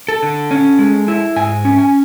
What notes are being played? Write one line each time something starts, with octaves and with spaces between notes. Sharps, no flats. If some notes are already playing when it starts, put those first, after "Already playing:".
A4
D3
C#4
G#3
E4
G#2 G#5
C#4
G#5